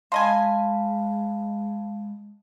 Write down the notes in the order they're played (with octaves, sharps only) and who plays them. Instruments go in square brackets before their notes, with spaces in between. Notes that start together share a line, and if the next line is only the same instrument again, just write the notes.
[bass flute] G#3 [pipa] C5 D#5 G#5 [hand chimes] F5 A5 B5